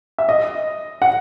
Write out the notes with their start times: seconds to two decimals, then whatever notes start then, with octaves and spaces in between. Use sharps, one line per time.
0.18 E5
0.29 D#5
1.02 F#5